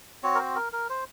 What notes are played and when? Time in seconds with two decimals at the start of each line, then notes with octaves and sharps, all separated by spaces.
0.23 C4 F#4 C#5
0.35 A#4
0.39 C5
0.56 A#4
0.73 A#4
0.89 C5